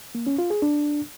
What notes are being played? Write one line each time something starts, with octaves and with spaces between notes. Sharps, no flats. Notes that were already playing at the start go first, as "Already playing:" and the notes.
A#3
C#4
F4
G#4
D4